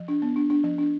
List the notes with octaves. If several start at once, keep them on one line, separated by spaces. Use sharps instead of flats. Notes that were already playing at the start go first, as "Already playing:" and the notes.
Already playing: F3
D4
B3
D4
D4
F3
D4